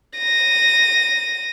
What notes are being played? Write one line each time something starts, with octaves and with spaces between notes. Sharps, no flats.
A#6 D#7